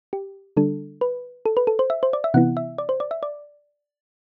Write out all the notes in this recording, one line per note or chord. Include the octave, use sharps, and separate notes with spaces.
G4
D3 G3 D4 A4
B4
A4
B4
A4
C5
E5
C5
D5
E5
C3 E3 B3 E4 F#5
E5
D5
C5
D5
E5
D5